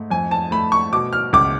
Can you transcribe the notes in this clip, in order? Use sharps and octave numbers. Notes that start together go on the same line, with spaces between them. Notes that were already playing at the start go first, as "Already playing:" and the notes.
Already playing: G#2 A3
F2 G#5
A5
A3 B5
C#6
B2 D6
F6
C#2 D6